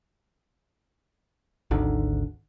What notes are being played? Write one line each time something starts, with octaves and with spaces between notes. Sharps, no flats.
G#1 D2 D3 D#3